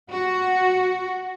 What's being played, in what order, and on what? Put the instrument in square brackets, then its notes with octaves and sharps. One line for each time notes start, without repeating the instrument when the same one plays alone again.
[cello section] F#4